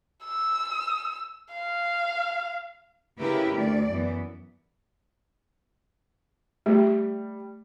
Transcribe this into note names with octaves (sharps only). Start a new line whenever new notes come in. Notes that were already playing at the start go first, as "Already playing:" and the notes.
E6
F5
C#3 E4 G4 A#4 B4
D2 A3 D5
F#2 E3 B3
G3 A3